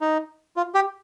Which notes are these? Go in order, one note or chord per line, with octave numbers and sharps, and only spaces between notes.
D#4
F4
G4